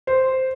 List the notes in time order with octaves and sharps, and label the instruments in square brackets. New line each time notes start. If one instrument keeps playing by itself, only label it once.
[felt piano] C5